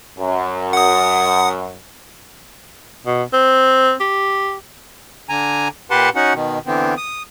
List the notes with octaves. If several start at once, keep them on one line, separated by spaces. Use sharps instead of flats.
F#2
F#5 D#6
B2
C4
G4
D3 G#5 A#5
A#2 G4 B4 F#5 A5 C6
C#4 D#4 F#4 F#5
B2 D#3
D3 E3 B3 C4
D#6